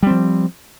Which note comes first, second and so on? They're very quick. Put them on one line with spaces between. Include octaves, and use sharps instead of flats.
G3 C4 F3